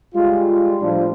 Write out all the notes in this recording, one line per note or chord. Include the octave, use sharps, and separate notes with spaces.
G3 G#3 F4
A2 F3 G3 D4 F4